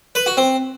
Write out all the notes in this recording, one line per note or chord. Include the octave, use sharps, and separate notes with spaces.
B4
F#4
C4